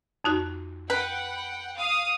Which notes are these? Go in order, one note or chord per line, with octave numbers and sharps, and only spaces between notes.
F2 D#4 F#4
B4 F#5 G5
F5 D#6